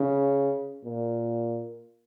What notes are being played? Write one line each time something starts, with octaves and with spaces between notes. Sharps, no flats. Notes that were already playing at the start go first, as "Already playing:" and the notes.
Already playing: C#3
A#2